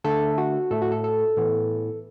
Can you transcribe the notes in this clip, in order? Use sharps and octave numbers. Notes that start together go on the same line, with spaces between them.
D3 A3 A4
F#4
A2 A3 A4
F#4
A4
A4
A2 E3 B3